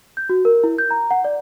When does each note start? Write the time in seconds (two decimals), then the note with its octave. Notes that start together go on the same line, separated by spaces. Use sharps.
0.17 G6
0.29 F#4
0.45 A#4
0.64 E4
0.78 G6
0.91 A#5
1.11 F#5
1.25 D5